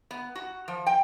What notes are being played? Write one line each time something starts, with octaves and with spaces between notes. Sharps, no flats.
B3
F#4
F3
G5